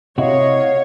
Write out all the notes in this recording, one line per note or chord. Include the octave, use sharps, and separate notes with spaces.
C3 E4 F#4 C#5 D#5 F5 F#5